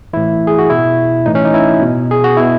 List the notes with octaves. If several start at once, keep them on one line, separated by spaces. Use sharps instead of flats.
A2 E3 E4
G#4
F#4
B2 E4
A2 E3 D#4
C#4
D#4
E4
B2
G#4
F#4
B2 E4